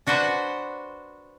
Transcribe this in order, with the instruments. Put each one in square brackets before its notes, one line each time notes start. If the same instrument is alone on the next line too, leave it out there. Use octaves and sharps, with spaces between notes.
[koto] D4 F#4 B4 C5 F#5